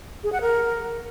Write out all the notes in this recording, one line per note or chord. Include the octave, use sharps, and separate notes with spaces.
G#4
F#5
A#4